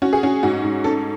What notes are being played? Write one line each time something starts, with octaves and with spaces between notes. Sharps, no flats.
C#4 F#4
G#4
C#4 F#4
G#2 F#4
G#2
C#4 A4